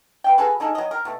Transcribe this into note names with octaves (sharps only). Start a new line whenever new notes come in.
B4 E5 G5
F#4 G#4 A4 B4
A#3 D#4 G#4 A4
F#3 D#5
A#4
B2 A3